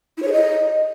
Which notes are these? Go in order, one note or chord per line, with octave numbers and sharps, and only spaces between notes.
E4
C#5
G#4
D#5